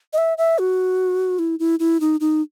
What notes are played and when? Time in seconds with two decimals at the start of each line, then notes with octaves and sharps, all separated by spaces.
0.13 D#5
0.18 E5
0.38 E5
0.59 F#4
1.39 E4
1.59 E4
1.79 E4
2.00 D#4
2.20 D#4